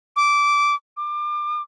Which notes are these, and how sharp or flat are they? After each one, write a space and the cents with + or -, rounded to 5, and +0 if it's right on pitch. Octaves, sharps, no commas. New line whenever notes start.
D6 -15
D6 +30